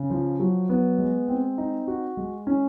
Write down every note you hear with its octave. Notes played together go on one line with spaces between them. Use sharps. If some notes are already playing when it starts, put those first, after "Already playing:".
Already playing: C#3
F3
F#3
B3
G#3
C4
D#4
F#4
G#3
C#4